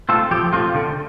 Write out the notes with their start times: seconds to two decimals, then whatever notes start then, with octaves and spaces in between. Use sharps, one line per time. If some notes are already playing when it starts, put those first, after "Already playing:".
0.09 A3 C4 F4 A4
0.31 F3 G4
0.53 A3 C4 F4
0.75 D3